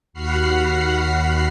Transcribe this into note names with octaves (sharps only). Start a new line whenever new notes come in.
D#2 F#4 F#5 B5 F6 C7